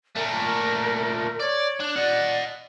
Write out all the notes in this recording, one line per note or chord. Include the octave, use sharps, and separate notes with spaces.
A#2 A3 A#4
C#5 D5
D4
D5 D#5 F#5